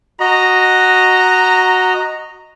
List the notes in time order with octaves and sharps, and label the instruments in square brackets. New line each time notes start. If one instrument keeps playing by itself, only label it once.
[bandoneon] F#4 D#5 [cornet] A#5